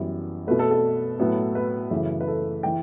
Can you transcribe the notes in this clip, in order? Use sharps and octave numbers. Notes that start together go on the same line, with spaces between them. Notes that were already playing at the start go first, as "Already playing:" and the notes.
Already playing: F#2 E3 G3 B3
B2 A3 B4
A4
A4
A2 F#3 B3
B4
F#2 C#3 E3 A3
B4
A4
E3 G5